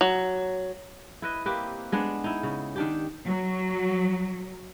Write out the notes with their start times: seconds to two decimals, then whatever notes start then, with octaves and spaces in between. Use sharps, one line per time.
0.01 F#3
1.22 E4 B4 D#5
1.46 A#3 C4 G4 B4
1.92 G#3 B3 D4
2.24 D#4 E4
2.43 C#3
2.76 D#3 D4 G4
3.26 F#3